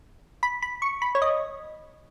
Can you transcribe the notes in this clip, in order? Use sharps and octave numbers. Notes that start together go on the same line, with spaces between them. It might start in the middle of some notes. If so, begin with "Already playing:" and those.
B5
B5
C#6
B5
C#5
D#5